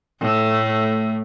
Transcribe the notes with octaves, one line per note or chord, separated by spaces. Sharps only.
A2 A3